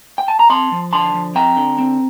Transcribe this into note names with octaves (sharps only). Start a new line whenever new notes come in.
G5
A5
A#5
C4 A5 C6
F3
D3 A5 C6
F3
C4 G5 A#5
D3
C4